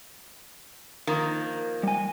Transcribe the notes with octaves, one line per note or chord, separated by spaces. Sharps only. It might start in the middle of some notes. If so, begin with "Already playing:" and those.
D#3 F3 A#3
G3 G#5